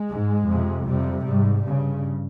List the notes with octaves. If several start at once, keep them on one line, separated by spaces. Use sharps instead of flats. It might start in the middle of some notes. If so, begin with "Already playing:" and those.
Already playing: G#3
G#2
F2 C3
F2 C3 G3
G#2 G3
G2 C#3